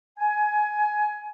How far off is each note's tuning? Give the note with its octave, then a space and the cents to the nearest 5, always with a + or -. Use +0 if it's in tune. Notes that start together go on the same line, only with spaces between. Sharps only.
G#5 +15